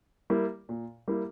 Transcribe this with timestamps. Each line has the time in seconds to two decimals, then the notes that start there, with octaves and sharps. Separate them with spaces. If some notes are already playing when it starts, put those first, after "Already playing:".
0.30 G3 A#3 E4
0.69 A#2
1.08 G3 A#3 E4